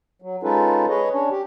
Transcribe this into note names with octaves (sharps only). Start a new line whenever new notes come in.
F#3
G#3 C#4 D#4 F4 A4 B4
G#4 B4 C#5 D#5
C#4 D4 C#5
G4